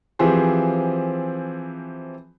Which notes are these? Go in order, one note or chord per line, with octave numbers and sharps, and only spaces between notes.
E3 F3 C4 G4 G#4 C5